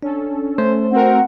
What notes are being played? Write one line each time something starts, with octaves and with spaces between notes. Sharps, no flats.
C#4 D4 A4
A3 C5
C4 F#4 A#4 F#5